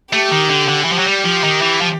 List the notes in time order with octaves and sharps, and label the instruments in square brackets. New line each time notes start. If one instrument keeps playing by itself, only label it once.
[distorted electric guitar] A3 [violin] G4
[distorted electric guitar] D#3
D3
D3
[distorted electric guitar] E3 [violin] G4
[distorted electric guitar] F3
F#3
G3
F3
D#3
E3
F3